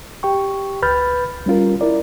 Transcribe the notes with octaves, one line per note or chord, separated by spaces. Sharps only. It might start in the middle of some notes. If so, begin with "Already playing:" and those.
G4 G5 C#6
C#2 B4 B5 F6 G6 A6
G3 C#4 F4 A#4
E4 A#4 D5